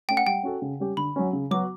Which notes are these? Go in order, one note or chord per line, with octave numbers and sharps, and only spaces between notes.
A3 C#4 G5
F#5
G3 G5
C#4 F#4 A4
C#3
G3 C#4 G4
D3 B5
F#3 C#4
C#3
F#3 B3 F#4 D6